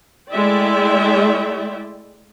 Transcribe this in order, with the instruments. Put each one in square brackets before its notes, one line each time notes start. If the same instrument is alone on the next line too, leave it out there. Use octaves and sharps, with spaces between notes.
[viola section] G#3 A3 E4 D5 E5 G5